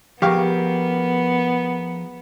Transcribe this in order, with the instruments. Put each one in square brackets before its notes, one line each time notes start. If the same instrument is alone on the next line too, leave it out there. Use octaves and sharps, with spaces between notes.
[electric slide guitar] F3 G#4 A#4 [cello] B3 [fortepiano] G4 F5 C#6